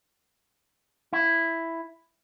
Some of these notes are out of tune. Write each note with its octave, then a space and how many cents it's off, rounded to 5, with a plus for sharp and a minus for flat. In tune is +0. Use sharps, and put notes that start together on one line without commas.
E4 +5